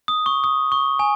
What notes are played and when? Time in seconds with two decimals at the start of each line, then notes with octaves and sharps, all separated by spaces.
0.08 D#6
0.26 C#6
0.44 D#6
0.72 C#6
0.99 G#5